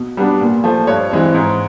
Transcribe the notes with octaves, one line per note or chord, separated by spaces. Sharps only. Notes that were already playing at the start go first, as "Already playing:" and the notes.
Already playing: B2
G3 B3 D4
A#2
F3 A3
G2 C#5
E3 G#3 C4
G#2